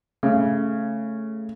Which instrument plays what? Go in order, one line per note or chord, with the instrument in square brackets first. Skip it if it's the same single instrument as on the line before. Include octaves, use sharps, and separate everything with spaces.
[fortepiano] C#3 [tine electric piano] A3